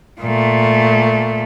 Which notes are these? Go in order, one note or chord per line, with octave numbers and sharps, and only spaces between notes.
A#2 A3